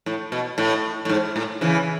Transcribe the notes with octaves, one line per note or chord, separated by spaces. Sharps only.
A2
B2
A2
A2
G#2
A2
C#3 E3